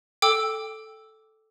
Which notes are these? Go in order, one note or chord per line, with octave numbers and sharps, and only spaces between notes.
A4 G5 D6 E6